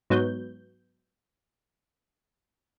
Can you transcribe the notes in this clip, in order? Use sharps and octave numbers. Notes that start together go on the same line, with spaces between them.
G#2 F#3 B3 G6